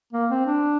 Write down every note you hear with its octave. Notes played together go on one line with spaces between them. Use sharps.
A#3
C4
D4